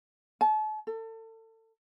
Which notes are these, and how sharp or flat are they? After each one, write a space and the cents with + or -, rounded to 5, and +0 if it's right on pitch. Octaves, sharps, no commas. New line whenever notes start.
A5 -40
A4 +30